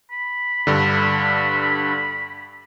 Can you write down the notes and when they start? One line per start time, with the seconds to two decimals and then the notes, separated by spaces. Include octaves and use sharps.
0.11 B5
0.67 G2 D3